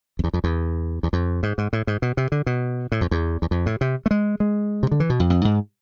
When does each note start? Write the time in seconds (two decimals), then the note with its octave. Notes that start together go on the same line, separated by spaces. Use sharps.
0.19 F2
0.24 E2
0.33 F2
0.44 E2
1.03 E2
1.13 F2
1.43 G#2
1.58 G#2
1.73 A2
1.87 G#2
2.02 B2
2.17 C3
2.32 D3
2.46 B2
2.92 A2
3.01 F2
3.11 E2
3.42 E2
3.51 F2
3.66 A2
3.81 C3
4.06 A3
4.11 G#3
4.40 G#3
4.83 C3
4.92 D3
5.00 E3
5.10 B2
5.20 F2
5.30 F2
5.45 G#2